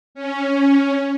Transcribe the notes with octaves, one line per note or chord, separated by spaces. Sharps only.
C#4